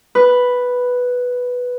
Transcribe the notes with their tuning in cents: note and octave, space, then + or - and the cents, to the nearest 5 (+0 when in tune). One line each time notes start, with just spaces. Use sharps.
B4 +0